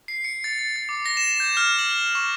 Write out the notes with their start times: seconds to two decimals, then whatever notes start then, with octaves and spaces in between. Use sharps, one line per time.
0.08 C7
0.24 C#7
0.44 A6
0.59 A6
0.76 A6
0.89 D6
1.06 A#6
1.17 E7
1.40 G6
1.57 F6
1.79 F#7
2.15 C#6